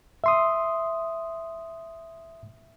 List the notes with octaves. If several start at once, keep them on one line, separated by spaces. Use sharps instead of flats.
E5 C6 D#6